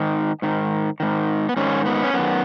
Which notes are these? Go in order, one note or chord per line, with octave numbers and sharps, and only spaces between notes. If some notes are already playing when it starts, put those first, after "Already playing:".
Already playing: G#2 D#3
G#2 D#3
G#2 D#3
B3
G#2 D#3 C#4
B3
C#4
F#2 D#3 B3